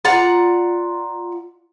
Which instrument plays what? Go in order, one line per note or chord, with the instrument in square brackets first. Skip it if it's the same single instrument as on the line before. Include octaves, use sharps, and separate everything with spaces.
[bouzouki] F4 D5 F#5 A#5